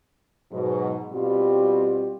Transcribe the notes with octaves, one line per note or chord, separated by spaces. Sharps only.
G#2 B2 F#3
B2 G3 C4 F4 G4